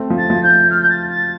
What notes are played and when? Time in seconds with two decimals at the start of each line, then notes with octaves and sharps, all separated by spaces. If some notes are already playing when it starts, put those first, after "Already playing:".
Already playing: A3 C4
0.10 F3
0.18 A6
0.30 F3
0.43 G6
0.70 F6
0.81 G6
0.89 A6
1.09 A6